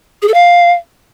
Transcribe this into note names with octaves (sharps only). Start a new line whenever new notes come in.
G#4
A4
F5